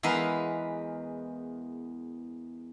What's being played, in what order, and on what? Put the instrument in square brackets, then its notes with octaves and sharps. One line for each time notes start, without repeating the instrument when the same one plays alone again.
[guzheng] E2 G#3 A#4 B4 F5